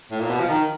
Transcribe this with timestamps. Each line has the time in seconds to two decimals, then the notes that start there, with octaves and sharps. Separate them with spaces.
0.11 A2
0.20 A#2
0.30 B2
0.40 F3
0.49 D#3